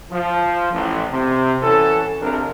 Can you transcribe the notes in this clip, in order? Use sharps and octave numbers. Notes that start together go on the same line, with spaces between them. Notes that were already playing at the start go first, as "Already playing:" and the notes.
F3
A1
C3
E3 C#4 F#4 A4
A#1 C3 F3 C4 D4 A#4